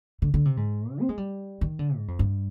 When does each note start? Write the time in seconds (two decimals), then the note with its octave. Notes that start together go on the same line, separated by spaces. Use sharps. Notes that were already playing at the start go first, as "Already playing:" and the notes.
0.22 D3
0.34 D3
0.45 C3
0.57 G#2
0.92 D3
1.01 C4
1.09 G#3
1.18 G3
1.61 D#3
1.79 D3
1.96 G#2
2.08 F2
2.19 G2